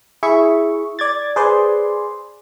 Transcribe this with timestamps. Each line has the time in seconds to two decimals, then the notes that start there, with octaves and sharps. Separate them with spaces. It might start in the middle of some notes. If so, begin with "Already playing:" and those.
0.23 E4 G#4 E5 C#6
0.99 D5 G#6 A6
1.36 G#4 B4 C5 D5 G#5 C6